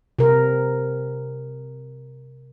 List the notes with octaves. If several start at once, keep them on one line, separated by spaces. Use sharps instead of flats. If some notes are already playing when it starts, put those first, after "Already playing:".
C3 A#4